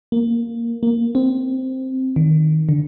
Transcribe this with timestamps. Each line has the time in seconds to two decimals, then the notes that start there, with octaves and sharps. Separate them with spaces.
0.12 A#3
0.83 A#3
1.15 C4
2.16 D#3
2.69 D3